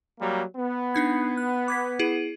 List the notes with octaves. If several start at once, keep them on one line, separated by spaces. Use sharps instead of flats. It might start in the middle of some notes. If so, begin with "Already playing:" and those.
F#3 G3 A#3
B3
D4 D#4 G#6
F#6
D6 G#6 B6
E4 G#4 D#7